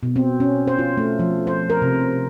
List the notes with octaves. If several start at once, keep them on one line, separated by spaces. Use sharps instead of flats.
B2
C4
C#4
C5
F4
A3
F3
C5
A#4
C3